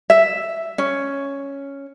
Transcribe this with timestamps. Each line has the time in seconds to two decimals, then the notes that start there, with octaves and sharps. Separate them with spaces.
0.10 E5
0.78 C#4